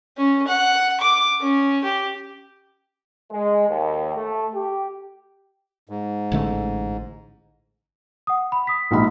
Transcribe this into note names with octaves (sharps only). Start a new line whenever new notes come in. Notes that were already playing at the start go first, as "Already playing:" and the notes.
C#4
F#5
D6
C#4
G4
G#3
D#2
A3
G4
G#2
A1 D3 A3
F#5 D#6
B5
D#6 B6
A#1 G#2 B5